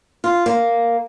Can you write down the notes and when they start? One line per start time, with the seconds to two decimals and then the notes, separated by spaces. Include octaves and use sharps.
0.24 F4
0.46 A#3